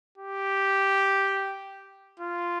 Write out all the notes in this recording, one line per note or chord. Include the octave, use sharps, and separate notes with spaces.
G4
F4